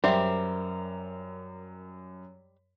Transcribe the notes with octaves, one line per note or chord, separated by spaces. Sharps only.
F#2 G3 G4 A#4 C5 E5